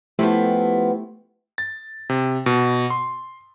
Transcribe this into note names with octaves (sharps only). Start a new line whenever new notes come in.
F3 A3 B3 E4 G4
A6
C3
B2
C6